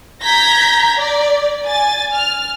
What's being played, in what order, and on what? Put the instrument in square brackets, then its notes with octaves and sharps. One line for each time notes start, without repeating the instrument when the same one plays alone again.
[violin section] A#5 G6 G#6 A#6 B6
D5
G#5 A6
F6